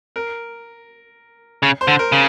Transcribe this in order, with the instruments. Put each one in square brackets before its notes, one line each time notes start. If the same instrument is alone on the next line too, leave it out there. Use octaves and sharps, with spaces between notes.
[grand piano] A#4
[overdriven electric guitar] C#3
[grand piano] C5
[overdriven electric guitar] D3
[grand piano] A#4
[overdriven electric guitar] C#3